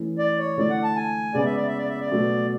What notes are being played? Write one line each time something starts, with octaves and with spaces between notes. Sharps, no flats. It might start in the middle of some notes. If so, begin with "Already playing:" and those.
Already playing: E3 A3 C#4 E4
D5
C#5
D3 A3 E4 D5
F#5
A5
G#5
C#3 G#3 B3 D5
E5
D5
E5
D5
E5
D5
B2 F#3 A3